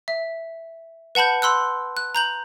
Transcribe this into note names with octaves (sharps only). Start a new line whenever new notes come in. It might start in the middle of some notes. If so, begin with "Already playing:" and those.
E5
B4 F#5 A5 B5 G6
B5 C6 E6 F#6
F#6
A#5 G6 F#7